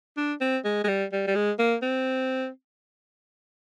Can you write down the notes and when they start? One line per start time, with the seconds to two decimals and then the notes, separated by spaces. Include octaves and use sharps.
0.17 D4
0.41 C4
0.65 G#3
0.84 G#3
0.88 G3
1.12 G3
1.27 G3
1.35 G#3
1.59 A#3
1.82 C4